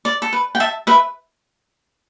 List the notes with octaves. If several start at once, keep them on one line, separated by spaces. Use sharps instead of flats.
D5
A4
B4
G5
E5 A5
B4 E5